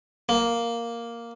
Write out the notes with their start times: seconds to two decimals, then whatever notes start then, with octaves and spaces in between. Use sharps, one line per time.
0.29 A#3